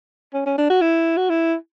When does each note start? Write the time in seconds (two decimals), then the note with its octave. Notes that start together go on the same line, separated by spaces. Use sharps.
0.34 C#4
0.46 C#4
0.58 D4
0.70 F#4
0.82 E4
1.17 F#4
1.30 E4